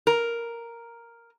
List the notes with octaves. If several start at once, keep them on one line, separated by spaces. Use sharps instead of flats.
A#4